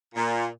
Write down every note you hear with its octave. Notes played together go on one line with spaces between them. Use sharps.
A#2